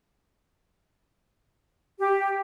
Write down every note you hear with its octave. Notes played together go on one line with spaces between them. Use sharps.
G4